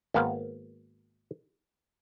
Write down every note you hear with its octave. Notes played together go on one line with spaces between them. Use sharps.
G#1 A#3 B3 F5